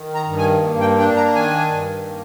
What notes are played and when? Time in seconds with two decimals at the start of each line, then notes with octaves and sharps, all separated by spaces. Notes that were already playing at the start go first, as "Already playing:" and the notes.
Already playing: D#3
0.15 A#5
0.26 G2
0.38 G#5
0.62 A#3
0.80 G5
0.98 D4 G5
1.16 A#5
1.35 D#3 G#5
1.70 G2
2.08 A#3